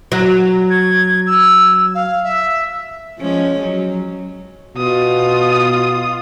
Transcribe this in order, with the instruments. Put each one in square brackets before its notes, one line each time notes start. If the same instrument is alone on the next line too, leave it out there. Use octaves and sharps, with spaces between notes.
[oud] F#3
[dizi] G#6
E6
F5
E5
[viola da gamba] F3 G#3 C#4
F#3
[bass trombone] B2 [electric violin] F4 D#6